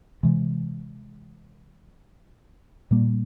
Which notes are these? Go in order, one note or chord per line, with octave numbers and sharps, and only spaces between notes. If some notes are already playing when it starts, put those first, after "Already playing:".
C3 E3 G#3
A#2 G3 A#3